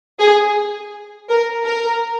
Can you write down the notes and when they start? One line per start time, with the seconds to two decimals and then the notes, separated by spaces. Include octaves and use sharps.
0.19 G#4
1.29 A#4
1.66 A#4